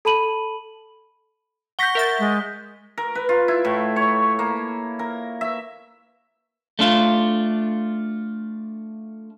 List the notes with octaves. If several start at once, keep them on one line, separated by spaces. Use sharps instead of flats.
A4 A5 B5 D#7 F#7
F#5 C#6 G6 A#6 B6 G7
A#4 E5 A6
G#3
A#4
B4
F4
E4
A2
C#5
A#3
A#4
E5
A3 D4 F4